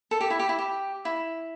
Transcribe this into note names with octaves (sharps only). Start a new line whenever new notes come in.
A4
G4
E4
G4
E4
G4
E4